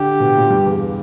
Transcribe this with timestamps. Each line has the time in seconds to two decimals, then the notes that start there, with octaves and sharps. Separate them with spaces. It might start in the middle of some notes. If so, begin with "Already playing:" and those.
Already playing: D3 G4
0.20 B2
0.35 A#2
0.50 G2
0.66 E2